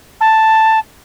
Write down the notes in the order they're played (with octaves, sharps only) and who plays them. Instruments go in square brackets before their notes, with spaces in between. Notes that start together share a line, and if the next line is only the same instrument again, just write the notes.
[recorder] A5